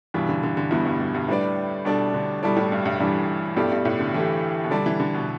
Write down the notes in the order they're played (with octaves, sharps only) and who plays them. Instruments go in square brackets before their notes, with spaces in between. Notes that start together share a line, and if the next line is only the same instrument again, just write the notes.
[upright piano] G2 E3 G3 [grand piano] B2
[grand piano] D3
D3
D3
[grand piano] E2 [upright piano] B2 G3 E4
[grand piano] G2
G2
G2
[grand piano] A2 [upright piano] G3 D4 B4 D5
[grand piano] B2 [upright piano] G3 D4 A4 D5
[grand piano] D3
[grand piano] B2 [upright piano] G3 E4 A4 D5
[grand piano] A2
G2
G2
[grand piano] G2 [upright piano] E3 G3 D4
[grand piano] G2 [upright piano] B2 A3 E4 G4 D5
[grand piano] G2
A2
D3
[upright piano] E3 A3 G4
[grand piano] B2
[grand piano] D3 [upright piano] G3 D4 A4 D5
[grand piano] E3
D3
B2